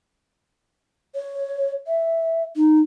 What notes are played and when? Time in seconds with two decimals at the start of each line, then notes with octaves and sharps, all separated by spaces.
1.15 C#5
1.87 E5
2.56 D#4